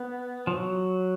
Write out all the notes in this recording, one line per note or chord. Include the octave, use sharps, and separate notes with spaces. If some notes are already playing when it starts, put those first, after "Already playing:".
Already playing: B3
F3
F#3